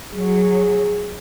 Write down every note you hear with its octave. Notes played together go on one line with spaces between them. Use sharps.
F#3 G#4